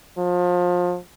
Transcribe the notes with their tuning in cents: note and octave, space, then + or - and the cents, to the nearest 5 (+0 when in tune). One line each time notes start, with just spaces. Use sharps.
F3 +30